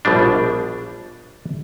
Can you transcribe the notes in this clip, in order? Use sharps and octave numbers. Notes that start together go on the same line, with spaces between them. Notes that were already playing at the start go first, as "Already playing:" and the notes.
A#1 B2 G3 D4